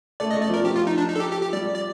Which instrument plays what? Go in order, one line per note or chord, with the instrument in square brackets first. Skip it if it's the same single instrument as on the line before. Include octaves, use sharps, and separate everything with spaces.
[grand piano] A3 [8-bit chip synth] D5
[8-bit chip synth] D#5
[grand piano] A3
[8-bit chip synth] D5
[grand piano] F3 [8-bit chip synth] A#4
[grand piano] F3 [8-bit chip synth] G4
[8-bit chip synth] F4
D#4
D4
D#4
A4
G4
G4
G4
[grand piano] G3 [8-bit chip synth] D5
[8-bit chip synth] D5